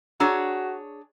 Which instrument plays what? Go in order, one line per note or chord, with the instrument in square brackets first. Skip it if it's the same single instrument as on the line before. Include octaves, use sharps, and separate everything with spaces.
[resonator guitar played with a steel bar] D4 G#4 C#5 [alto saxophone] F#4 [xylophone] A#5 E6